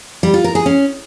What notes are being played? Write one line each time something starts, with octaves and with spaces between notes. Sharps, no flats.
G3
F4
A#4
G#4
C#4